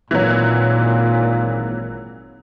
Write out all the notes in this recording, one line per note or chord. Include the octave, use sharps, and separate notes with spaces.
G#1 A#2 E3 F#3